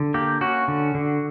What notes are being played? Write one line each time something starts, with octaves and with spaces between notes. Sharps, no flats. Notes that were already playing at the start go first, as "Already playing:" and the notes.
Already playing: D3
A#3 G4
C#4 F#4
D3
D3